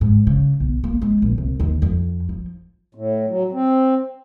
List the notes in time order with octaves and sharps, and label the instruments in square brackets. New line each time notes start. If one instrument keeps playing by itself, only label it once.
[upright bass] G#2
C#3
B1
A#3
G#3
A#1
C2
D#2
F2
F3
[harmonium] A2
F#3
C4